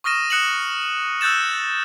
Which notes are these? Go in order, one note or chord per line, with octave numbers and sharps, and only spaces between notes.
C#6 D#6 F6 A#6 D#7 E7
D#6 F#6 C#7 E7 F#7
E6 F#6 G6 A6 E7